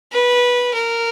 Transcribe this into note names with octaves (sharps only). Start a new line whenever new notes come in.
B4
A#4